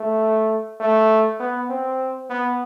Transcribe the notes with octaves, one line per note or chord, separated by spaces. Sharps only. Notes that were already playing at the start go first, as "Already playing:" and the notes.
Already playing: A3
A3
B3
C4
B3